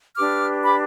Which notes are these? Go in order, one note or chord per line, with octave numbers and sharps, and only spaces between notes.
D4 G4 B4 D6 F6
B5 D6